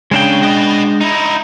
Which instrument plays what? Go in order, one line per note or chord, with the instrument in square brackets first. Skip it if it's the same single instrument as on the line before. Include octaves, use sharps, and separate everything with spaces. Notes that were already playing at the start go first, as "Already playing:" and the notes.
[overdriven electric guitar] C#3 [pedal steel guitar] G#3 D4 G5
[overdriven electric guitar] F#4 D#5
D#4 E4